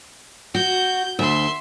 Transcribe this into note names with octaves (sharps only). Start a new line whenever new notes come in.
F#4 G6
D2 E5 C6